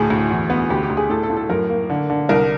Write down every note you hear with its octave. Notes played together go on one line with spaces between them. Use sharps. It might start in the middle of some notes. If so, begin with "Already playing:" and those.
Already playing: D2 A2 G#4
D2
E2
B3
D2 G4
G4
D2
G#4
A2 A4
A4
A2
A4
F#2 A#4
A#3
D3
D3
C2 A#4